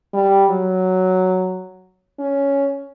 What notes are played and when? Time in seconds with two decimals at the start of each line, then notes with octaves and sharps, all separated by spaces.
0.13 G3
0.51 F#3
2.19 C#4